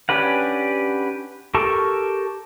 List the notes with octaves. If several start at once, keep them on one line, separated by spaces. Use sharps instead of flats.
C#4 D4 G4 B4 F#5
G4 A4 A#4 A5 C#6